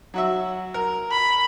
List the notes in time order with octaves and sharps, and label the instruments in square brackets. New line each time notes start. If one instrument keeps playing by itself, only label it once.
[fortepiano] F#3 F#4 E5
A#4
[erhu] B5